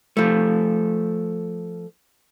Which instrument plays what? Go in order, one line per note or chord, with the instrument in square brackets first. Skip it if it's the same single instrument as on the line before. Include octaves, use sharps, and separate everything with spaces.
[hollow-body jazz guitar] F3 A3